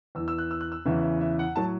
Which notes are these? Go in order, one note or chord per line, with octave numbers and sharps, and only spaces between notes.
E2 E3 E6
E6
F#6
E6
F#6
E6
E2 C#3 E3 E5
E5
E5
F#5
A2 F#3 A5